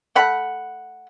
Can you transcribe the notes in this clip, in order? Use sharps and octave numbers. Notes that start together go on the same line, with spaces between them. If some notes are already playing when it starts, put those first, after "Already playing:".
A3 F#5 B5